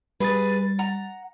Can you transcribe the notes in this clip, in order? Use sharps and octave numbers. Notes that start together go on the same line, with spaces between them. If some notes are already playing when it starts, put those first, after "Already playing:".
G3 G#4 B4 A6
F#5 A#5